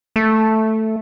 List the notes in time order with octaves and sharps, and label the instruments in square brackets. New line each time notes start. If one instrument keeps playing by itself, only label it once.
[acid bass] A3